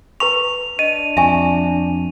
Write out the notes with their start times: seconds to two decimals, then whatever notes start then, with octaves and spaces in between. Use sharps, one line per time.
0.20 B4 A#5 C#6 F7
0.79 D4 D#5 D#7
1.17 F2 E5 G#5 C#6